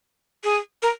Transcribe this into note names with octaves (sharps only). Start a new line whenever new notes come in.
G#4
A#4